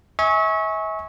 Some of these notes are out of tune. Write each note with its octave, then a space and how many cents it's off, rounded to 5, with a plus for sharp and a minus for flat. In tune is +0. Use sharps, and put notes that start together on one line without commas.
E5 -40 G#5 +0 C#6 -10